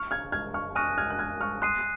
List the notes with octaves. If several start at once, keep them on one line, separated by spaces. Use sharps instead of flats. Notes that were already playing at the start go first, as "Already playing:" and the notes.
Already playing: C#6 F6
F6 G#6
F6 G#6
C#6 F6
G#5 C#6 D#6 F6 F#6 A#6 D#7
F6 G#6
F#6
F6 G#6
C#6 F6
C6 D#6 F#6 C7 D#7